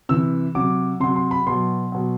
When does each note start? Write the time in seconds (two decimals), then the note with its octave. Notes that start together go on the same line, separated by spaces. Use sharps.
0.09 C3 E3 E6
0.55 C3 F#3 D6
1.00 C3 F#3 C6
1.16 C6
1.31 B5
1.47 B2 F#3 C6
1.92 B2 F#3